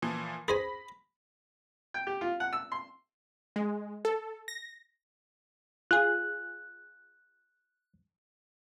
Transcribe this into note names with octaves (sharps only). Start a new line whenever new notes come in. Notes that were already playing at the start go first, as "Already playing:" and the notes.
A#2 E3 F3
G#4 C5 G#5 B5 A#6 B6
G5
G4
F4
F#5
E6
C6
G#3
A4
A#6
F4 G#4 F#6